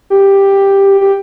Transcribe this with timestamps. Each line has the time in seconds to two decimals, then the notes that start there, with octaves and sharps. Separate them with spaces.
0.10 G4
1.01 G4